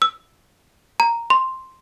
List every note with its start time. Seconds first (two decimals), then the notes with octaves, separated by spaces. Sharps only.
0.02 E6
1.00 A#5
1.30 C6